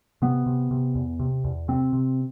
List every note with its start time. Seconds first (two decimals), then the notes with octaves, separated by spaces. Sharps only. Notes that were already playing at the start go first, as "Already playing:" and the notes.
0.22 C3 B3
0.46 C3
0.71 C3
0.95 E2
1.20 C3
1.44 E2
1.68 C3 C4
1.93 C3